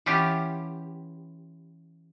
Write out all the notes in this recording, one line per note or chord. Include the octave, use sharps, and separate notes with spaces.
E3 B3 C#4 F4 G4